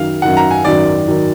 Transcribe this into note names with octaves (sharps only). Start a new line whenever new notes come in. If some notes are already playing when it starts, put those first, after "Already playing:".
Already playing: F#2 D#3 F#3 F5
F#2 D#3 F#3 F#5
A#5
G#5
F#2 D#3 F#3 D5
D#3 F#3